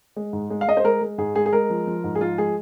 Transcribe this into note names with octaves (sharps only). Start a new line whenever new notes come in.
G#3
G#2
G#3
F5
G#3 D#5
C5
G#3 A#4
G#3
G#2 G#4
G#3 G#4
G#4
G#3 A#4
F3
F3
G#2
G#4
F3 F4
G#3 G#4